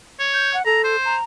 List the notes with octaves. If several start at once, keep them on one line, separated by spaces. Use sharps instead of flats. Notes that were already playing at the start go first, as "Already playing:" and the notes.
C#5
G6
F#5
A4 A#5
C5
A#5